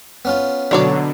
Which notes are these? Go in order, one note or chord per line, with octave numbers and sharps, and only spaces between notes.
B3 C#4 F4
B2 D3 F#3 D4 C#5 D5